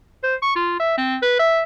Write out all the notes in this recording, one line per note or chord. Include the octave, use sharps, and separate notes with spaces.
C5
C#6
F4
E5
C4
B4
E5